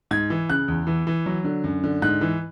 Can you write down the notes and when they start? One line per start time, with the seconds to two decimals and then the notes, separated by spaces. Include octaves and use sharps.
0.11 G#2 G#6
0.30 E3
0.49 C#3 F#6
0.68 E2
0.87 E3
1.07 E3
1.26 F#3
1.44 D3
1.64 F#2
1.84 D3
2.02 G#2 F#6
2.21 E3